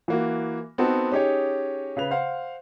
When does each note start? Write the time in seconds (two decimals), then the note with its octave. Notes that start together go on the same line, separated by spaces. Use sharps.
0.08 E3 A#3 F#4
0.78 B3 C4 D#4 F#4 A4
1.12 C#4 D#4 G4 G#4 C#5
1.97 C#3 B4 F7
2.11 C5 F5 F#5